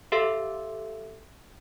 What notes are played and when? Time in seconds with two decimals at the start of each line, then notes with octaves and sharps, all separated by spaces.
0.12 G4 A4 E5 F5 C6 E6